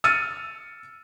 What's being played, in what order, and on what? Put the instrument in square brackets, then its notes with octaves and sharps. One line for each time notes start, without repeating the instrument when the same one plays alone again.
[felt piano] E6 F6 A6 C#7 D#7